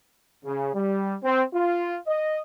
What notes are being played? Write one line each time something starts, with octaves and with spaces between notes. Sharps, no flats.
C#3
G3
C4
F4
D#5